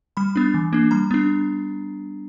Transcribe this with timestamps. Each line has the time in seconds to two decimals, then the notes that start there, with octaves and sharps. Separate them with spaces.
0.17 G3 B5
0.36 B3 D4
0.54 E3
0.73 A#3 D4
0.91 G3 A#5
1.11 B3 D4